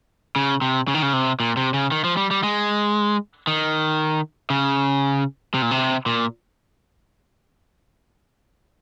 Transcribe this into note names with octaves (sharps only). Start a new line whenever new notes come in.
C#3
C3
C#3
D#3
C#3
C3
A#2
C3
C#3
D#3
F3
G3
G3
G#3
D#3
C#3
C3
A#2
C3
A#2